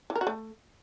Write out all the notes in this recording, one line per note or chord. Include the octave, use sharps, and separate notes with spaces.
E3
A#4
F#4
A3